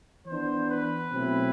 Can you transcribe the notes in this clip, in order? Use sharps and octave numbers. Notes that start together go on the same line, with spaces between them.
E3 B3 D4 C5
B4
B2 F#3 A3 C4 E4